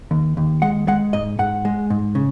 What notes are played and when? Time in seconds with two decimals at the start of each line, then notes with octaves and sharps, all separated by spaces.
0.11 D#2
0.37 D#2
0.62 G#3 F#5
0.88 G#3 F#5
1.13 G#2 D#5
1.39 G#2 F#5
1.65 G#3
1.90 G#2
2.15 C#3